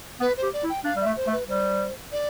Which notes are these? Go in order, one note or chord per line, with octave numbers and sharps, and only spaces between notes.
B3 B4
C5
G4
D5
E4
G5
D4 F5
G3 E5
A3
C5
A3
B4
G3 C5
D5